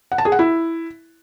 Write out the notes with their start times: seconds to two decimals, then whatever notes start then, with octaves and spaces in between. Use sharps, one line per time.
0.12 F#5
0.18 A5
0.25 G#4
0.32 F#5
0.39 E4